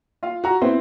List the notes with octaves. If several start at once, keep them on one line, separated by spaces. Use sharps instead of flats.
F4 F5
F#4 A#5
B3 C4 E4 C5